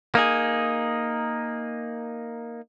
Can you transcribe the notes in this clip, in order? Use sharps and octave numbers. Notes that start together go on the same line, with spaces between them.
A#3 D#4 G#4